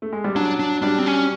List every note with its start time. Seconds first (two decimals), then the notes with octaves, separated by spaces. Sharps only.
0.02 A3
0.12 G#3
0.24 G3
0.35 F#3 D4
0.59 D4
0.82 G3 D4
0.99 C4
1.06 C#4